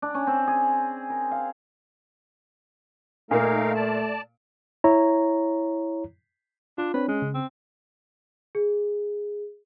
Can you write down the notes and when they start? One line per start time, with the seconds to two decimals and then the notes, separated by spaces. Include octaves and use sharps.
0.02 D4
0.14 C#4
0.27 C4
0.47 G#4
1.10 A#4
1.31 F5
3.31 A#2 A3 A#3 D#4 A#4 F5
3.75 D5 A5
4.84 E4 C#5 A#5
6.78 D4 F4
6.94 C4 D4 B4 C#5
7.08 G#3 C#4
7.22 C#3
7.35 C4
8.55 G#4